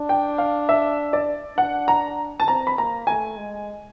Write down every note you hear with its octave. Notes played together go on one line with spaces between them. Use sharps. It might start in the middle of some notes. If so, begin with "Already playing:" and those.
Already playing: D4
G5
F5
E5
D5
D4 F#5
A#5
A5
C4 A#5
B5
A#3 A#5
A3 G#5
G#3